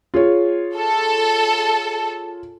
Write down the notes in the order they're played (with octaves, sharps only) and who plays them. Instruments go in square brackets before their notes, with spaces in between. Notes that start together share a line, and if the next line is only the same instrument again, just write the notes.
[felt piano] F4 G#4 C#5
[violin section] A4